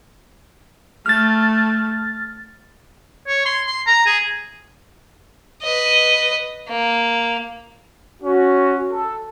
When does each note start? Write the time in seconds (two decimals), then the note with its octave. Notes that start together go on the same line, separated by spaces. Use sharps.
1.06 A3 F6 A6
3.27 C#5
3.46 C6
3.67 C6
3.87 A#5
4.06 G#4
5.62 B4 D#5
6.68 A#3
8.22 C#4 F#4
8.91 A4